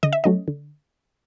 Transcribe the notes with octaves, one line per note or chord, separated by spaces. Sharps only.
D3 D#5
E5
F#3 A3 C#4 D#5
D3